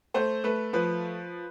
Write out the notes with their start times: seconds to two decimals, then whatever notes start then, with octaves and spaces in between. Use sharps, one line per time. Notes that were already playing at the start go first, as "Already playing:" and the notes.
0.14 A3 C5
0.44 A3 B4
0.73 F3 B4